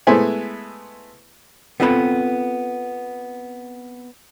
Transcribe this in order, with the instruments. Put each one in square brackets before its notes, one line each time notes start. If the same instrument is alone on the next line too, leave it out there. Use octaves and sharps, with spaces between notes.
[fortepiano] G#3 A3 B3 E4 C5 G#5
[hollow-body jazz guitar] B3 C4 F4 A4 B4 B5